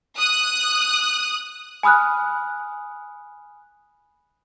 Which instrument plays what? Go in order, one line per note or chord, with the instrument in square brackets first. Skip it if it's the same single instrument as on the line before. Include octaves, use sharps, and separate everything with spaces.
[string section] D#6 F#6
[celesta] G#5 B5 D#6 F6 F#6